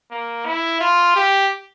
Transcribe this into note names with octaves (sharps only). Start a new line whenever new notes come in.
A#3
E4
F4
G4